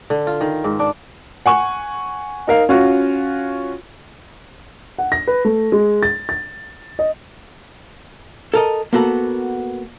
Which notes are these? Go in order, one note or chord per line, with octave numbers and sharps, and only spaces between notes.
D3
F4
D#3
G#2
D4
F#5 G#5 C#6
D#4 A#4 F5
C#4 F4 F#4
F#5
A#6
B4
A3
G#3
A6
A6
D#5
A4 A#4 D#5
A#3 B3 F#4 A4